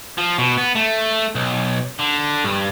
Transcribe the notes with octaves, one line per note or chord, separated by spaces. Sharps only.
F3
B2
B3
A3
B1
D3
G2